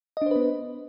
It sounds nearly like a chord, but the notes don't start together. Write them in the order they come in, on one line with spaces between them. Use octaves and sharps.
D#5 D4 C5 B4 B3